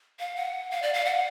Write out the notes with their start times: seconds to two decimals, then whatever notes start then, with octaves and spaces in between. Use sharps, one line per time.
0.19 F5
0.36 F#5
0.71 F5
0.82 D5
0.93 F5
1.05 F#5